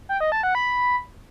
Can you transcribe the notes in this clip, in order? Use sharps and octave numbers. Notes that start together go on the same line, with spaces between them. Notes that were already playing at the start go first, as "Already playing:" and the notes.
G5
D#5
A5
F#5
B5